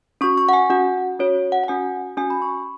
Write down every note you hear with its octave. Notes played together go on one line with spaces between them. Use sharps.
C#4 F#4 C#6
C#6
F#5
G#5
C#4 F#4 F#5
C#4 F#4 C#5
F#5
F#5
C#4 F#4 G#5
C#4 F#4 G#5
B5
C#6